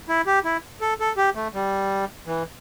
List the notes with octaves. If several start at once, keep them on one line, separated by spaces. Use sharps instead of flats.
E4
G4
E4
A4
A4
G4
A3
G3
E3